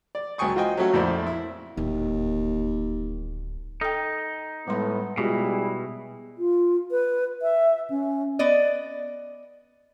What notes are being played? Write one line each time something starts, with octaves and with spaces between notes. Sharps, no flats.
D5
C#2 F#3 G5 G#5 C#6 D#6
F4 F#4 C5 D#5 G5 G#5
F#3 A3 C#4 F#4
A#1 F2 A3 E4 C5 D5
E4
D1 D#2
D#4 A4 G5
A2 G3 G#3 B3 C6
B2 G3 G#3 E4 F4 G4 G#4
F4
B4
E5
C#4
B3 D5 D#5